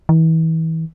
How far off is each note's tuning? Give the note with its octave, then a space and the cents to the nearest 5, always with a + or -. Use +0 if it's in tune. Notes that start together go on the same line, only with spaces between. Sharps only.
E3 -35